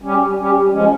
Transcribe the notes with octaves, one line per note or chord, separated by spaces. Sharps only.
G3 C#4 G4
G3 C#4 G4
F3 G#3 C#4